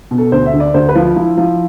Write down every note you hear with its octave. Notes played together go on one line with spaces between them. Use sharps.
B2
A4
D2 C5
E5
D3
D5
D2 C5
B4
F3
F4
F3 E4
F3